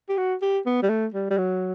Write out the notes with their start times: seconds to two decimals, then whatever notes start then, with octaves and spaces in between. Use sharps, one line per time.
0.09 G4
0.17 F#4
0.42 G4
0.66 B3
0.83 G3
0.89 A3
1.14 G3
1.30 G3
1.38 F#3